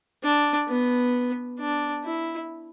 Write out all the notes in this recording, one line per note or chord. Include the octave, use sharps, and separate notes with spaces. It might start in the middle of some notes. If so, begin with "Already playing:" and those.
D4
B3
D4
E4